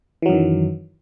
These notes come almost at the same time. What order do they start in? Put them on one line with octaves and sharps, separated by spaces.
E3 F#3 F#2 D#3